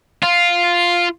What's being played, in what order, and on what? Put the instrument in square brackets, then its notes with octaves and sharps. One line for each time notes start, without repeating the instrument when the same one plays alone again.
[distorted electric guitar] F4